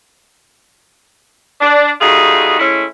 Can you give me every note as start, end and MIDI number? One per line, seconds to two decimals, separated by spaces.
1.61 1.90 62
2.01 2.57 55
2.01 2.57 57
2.01 2.57 63
2.01 2.57 65
2.01 2.57 66
2.01 2.57 68
2.59 2.85 56
2.59 2.85 57
2.59 2.85 61
2.59 2.85 64